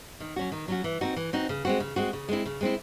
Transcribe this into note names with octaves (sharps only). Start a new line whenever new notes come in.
D#3
F#3 C#4 F#4
D#3
F#3 C#4 F#4
E3
C4 D#4 F#4
E3
C4 D#4 F#4
C#3
G#3 C4 F#4
C#3
G#3 C4 F#4
C#3
G#3 C4 E4
C#3
G#3 C4 E4